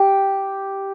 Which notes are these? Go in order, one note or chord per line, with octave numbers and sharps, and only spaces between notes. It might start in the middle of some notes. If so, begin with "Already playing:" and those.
Already playing: G4